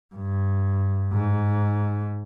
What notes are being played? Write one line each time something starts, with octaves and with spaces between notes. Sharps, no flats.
G2
G#2